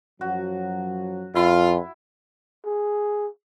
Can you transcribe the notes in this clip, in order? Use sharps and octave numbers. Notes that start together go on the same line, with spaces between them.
F#2 F3 F#3 F#4
F2 E4 F4
G#4